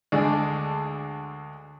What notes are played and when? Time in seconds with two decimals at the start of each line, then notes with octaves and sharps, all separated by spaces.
0.12 D2 D3 G#3 D4 G#4